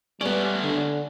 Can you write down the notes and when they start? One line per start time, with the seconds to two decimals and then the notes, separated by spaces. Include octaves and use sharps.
0.21 G3 A3 B3 C#4 D5
0.62 D3